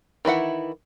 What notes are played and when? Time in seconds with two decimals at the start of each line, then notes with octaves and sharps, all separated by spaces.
0.25 D#3 E3 E4 F#5